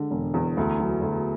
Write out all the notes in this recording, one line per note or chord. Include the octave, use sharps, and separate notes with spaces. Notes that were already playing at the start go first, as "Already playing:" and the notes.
Already playing: D3 G#3
E1
E2
D2
F#3
D2